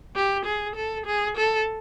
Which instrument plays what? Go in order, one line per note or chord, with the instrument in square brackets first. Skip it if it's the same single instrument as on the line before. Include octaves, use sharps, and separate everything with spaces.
[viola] G4
G#4
A4
G#4
A4